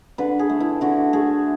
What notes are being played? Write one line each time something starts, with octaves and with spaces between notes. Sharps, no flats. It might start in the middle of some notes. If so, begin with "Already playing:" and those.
D3 B4
G#4
A3
E4
D3 F#4
A3 G#4